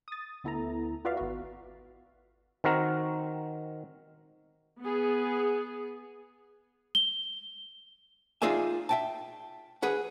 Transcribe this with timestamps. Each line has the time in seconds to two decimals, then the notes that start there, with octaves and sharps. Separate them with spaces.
0.08 D#6 A6
0.44 D2 B3 E4 A4 A#5
1.05 F4 F#4 B4 D5 E5 F5
1.17 G#1 B3 F#4
2.64 D#3 C4 F#4 A#4
4.80 B3 G#4
6.95 G7
8.42 D#4 F4 G#4 D5 E5 G#5
8.89 E5 G5 A5
9.82 G#4 B4 F#5